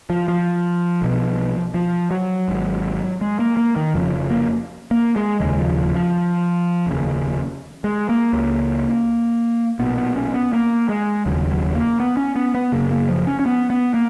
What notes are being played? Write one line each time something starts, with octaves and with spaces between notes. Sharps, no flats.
F3
F3
B1 B2
F3
F#3
G#1 G#2
G#3
A#3
A#3
D#3
F1 F2 C#3 F3
A#3
A#3
G#3
F1 D#2 C#3 G#3
F3
F3
F3
F1 D#2 C#3
G#3
A#3
C#2 C#3
B1 A#2 B3
B3
C#4
B3
A#3
G#3
F1 D#2 C#3 F#3
F#3
A#3
B3
C#4
B3
B3
F#1 F#2 C#3 A#3
A#3
F3
C#4
C#4
B3
B3
A#3